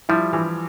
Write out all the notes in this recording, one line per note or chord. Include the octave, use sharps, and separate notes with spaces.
F3 G3 E4
E3